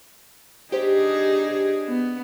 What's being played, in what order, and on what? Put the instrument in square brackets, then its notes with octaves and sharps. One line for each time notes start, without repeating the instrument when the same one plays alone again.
[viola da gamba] D4 D#4 G#4 [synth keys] G4 C5 B6
[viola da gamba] B3